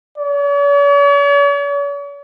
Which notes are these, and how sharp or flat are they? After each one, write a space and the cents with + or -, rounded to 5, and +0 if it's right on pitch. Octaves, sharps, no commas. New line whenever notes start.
C#5 +45